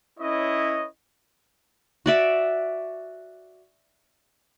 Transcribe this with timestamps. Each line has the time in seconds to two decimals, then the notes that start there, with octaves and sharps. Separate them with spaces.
0.20 C#4 E4 B4 C#5 D#5
2.06 F#4 D5 E5